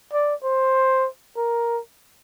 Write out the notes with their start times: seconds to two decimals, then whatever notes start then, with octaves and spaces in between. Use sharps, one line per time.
0.13 D5
0.44 C5
1.37 A#4